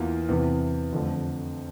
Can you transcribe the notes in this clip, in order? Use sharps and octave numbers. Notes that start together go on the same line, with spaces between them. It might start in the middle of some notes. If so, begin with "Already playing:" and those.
Already playing: E2 E3 A#3 F4
E2 C3 E3
F2 D3 F3 A3